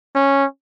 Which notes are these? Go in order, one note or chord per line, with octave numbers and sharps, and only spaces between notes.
C#4